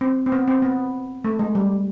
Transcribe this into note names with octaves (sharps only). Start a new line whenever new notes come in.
C4
C4
B3
C4
B3
A3
G#3
G3